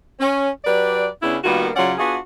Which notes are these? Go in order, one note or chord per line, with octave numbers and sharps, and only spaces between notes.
C#4
F#3 G4 B4 D5
C#3 B3 C#4 D4 E4
D#3 G3 A#3 B3 F4 F#4
C#3 F#3 C#4 F4 D5 F#5
B3 D4 F4 F#4 G#4